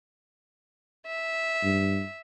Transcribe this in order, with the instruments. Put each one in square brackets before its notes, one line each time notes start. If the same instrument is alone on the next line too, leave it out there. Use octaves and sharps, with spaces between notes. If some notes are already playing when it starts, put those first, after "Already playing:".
[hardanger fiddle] E5
[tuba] G2